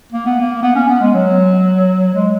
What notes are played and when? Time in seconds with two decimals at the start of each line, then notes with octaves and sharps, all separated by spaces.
0.12 A#3
0.26 B3
0.40 A#3
0.62 B3
0.75 C#4
0.88 B3
1.00 G#3
1.14 F#3
2.14 G#3